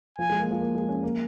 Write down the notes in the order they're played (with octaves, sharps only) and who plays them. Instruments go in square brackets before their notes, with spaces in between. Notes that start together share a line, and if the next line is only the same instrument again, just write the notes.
[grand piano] F3 [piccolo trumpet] G#5
[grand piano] G#3
A#3
F3
A#3
G#3
C#4
A#3